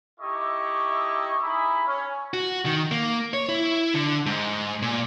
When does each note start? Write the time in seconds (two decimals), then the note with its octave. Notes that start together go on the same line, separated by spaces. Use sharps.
0.20 D#4 E4 G4 A4 D#5 C#6
1.43 D#4 E4 G#4 B5
1.86 C#4
2.34 F#4
2.66 D#3
2.91 A#3
3.34 C#5
3.49 E4
3.94 D3
4.26 G#2
4.82 A#2